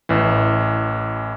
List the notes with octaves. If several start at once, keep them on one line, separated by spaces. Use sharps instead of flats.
A1 E3